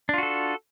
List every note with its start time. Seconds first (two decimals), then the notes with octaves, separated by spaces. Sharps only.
0.09 D4
0.14 F4
0.18 F#4
0.23 A4